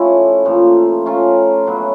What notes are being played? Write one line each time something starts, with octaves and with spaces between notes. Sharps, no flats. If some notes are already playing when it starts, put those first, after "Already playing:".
Already playing: F3 A3 C#4 E4 G4
A#2 F3 A3
A3 C#4 F4 A#4
C#3 F#3 B3 E4